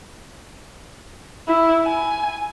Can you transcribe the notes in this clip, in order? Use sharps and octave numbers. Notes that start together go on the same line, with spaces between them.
E4
G#5